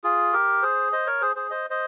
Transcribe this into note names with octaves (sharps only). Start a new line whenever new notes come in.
F4 G#4
G4 A#4
G#4 C5
C5 D#5
A#4 C#5
G#4 C5
G#4 C5
C5 D#5
C5 D#5